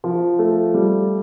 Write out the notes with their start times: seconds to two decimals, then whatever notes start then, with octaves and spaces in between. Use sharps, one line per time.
0.04 F3
0.39 A3
0.74 G3